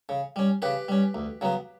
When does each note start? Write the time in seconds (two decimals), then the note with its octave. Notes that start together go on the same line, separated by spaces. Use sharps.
0.09 C#3
0.36 G3 C#4
0.62 C#3 G4 B4
0.88 G3 C#4
1.15 D2
1.41 C#3 F#3 B3